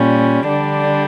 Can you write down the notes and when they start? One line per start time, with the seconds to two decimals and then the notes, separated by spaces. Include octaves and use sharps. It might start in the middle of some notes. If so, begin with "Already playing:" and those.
Already playing: A#2 G3 C#4
0.47 D3 G3 D4